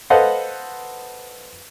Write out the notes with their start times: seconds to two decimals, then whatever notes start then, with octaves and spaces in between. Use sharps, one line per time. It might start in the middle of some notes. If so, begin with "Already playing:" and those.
0.10 A4 B4 C5 D#5 F5 F#5